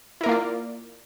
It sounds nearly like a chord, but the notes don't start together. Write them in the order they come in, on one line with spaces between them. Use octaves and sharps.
E4 A#4 A#3 F4 D5